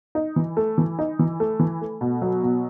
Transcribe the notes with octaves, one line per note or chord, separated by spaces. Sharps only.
D#4
E3
A3
E3
D#4
E3
A3
E3
A3
B2
F#3
B2